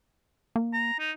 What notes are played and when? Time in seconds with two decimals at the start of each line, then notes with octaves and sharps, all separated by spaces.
0.56 A#3
0.73 A#5
0.99 D#4